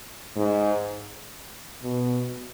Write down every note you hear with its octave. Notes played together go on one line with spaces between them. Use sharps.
G#2
B2